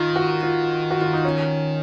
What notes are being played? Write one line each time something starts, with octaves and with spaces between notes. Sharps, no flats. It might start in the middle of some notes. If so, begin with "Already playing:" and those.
Already playing: D#3 D#4 F4
F#4
F4
F#4
F4
D#4
C#4